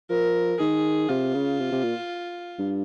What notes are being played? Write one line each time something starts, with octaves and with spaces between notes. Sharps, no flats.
F3 A#4
D#3 G#4
C3 F4
C#3
C3
C3
A#2
G2